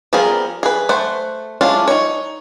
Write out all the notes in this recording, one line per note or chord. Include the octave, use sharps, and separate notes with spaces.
F3 G3 B3 G#4 A#4
G#4 B4
A3 C5 F#5
G#3 C#4 D4 E4 F4
D#4 C#5